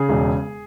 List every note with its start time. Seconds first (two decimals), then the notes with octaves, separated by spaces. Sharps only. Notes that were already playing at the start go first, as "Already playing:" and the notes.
Already playing: C#3 G#4
0.09 E1